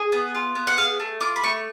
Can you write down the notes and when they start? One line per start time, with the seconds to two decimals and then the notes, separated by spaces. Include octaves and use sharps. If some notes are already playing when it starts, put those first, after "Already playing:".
Already playing: G#4
0.12 B3
0.35 F4
0.55 B3
0.67 F#5
0.77 G#4 F5
1.00 A3
1.21 F4 D6
1.36 B5
1.43 A3 C#6